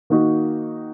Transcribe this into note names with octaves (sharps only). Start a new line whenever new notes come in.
D#3 A#3 D#4 F#4